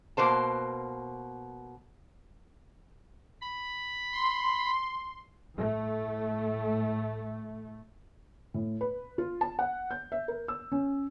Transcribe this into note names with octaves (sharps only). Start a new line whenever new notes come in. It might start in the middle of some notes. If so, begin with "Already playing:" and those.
B2 A#3 C5 A5
B5
C6
A2 A3
A2
B4
F4
A5
F#5
G6
E5
A#4
E6
C#4